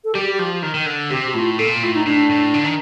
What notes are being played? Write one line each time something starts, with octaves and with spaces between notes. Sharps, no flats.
A4
G3 G4
G4
F3 G4
D#3
D#3
D3
C3 G4
A2 F4
A#2 A4
A2 F4
D#4
A2 D4
A2
D3
D#3